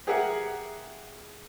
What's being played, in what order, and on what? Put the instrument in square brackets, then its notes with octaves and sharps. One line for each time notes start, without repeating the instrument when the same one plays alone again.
[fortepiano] G4 G#4 A#4 E5 F#5